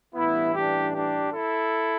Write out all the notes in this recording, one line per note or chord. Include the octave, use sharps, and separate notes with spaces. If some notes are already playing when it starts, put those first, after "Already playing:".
A1 G2 E3 B3 E4
D4 G4
D4 G4
E4 A4